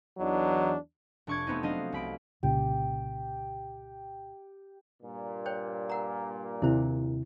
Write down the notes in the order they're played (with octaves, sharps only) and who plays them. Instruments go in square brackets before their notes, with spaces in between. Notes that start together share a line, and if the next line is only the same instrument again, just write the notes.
[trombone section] E2 E3 F#3 D4 D#4
[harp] F1 D4 C#6 D6 G#6
A3 B3 C4 D#4
F#3 D4 D#5 F5
C2 B5 D7
[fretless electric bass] C2 A#2 C#3 [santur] G4
[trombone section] G2 A#2
[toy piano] C5 C#5 G5
A#4 F#5 A#5
[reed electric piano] D#2 C3 [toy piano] E4 C5